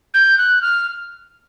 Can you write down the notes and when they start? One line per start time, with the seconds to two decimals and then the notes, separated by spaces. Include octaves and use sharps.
0.14 G6
0.38 F#6
0.62 F6